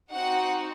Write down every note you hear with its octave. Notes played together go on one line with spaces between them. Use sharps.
C4 D#4 F#4 F#5